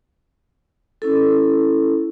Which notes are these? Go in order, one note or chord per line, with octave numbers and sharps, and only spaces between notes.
C#4 E4 A4